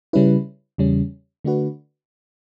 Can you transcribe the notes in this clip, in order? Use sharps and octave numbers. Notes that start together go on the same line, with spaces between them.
C#3 G3 C#4 E4 B4
E2 C#3 G3 C#4
D3 A3 D4 F#4 B4